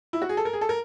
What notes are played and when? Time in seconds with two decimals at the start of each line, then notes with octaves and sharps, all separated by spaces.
0.13 E4
0.22 F#4
0.29 G#4
0.37 A4
0.45 A#4
0.53 G#4
0.61 A4
0.69 A#4